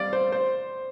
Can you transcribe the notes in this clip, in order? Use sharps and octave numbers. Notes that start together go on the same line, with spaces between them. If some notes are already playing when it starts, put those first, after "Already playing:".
Already playing: G3 C4 D5 F5
C5
C5